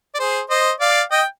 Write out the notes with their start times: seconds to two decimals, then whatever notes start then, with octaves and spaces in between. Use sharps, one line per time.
0.15 D5
0.19 G#4 C5
0.50 C5 D#5
0.80 D5 F5
1.11 D#5 G5